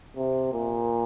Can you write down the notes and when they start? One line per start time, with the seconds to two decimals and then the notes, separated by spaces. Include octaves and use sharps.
0.16 C3
0.53 A#2